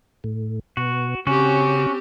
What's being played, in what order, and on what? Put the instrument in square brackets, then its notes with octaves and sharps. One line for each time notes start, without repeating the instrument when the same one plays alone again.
[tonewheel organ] A2
[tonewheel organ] B2 [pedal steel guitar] F#4
[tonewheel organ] C#3 [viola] C4 G4 [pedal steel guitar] C#4 F#4